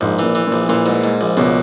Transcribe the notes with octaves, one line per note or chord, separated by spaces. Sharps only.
A#1 G#2
A#2 E3
E3
A#1 A#2
A#2 E3
G#2
G#2
A#1
C#2 B2